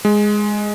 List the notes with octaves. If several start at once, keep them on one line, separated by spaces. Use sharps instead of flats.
G#3